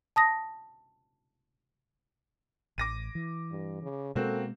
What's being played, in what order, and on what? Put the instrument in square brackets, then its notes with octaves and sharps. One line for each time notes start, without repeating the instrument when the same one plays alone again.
[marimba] A5 D#6 A#6
[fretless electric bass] A1 [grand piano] D6 A#6 D#7
[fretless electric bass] E3
[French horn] G2
C#3
[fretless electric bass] B2 G#3 [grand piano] A#3 C4 F#4 [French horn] A4